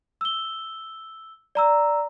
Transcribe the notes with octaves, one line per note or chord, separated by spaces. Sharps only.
E6 G7
D5 A#5 E6